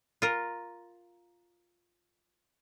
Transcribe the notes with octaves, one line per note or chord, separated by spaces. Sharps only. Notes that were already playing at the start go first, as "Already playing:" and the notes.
F4 A#4